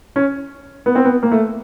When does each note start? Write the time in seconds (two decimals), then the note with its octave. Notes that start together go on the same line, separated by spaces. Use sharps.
0.16 C#4
0.86 B3
0.95 C4
1.05 B3
1.23 A#3
1.32 A3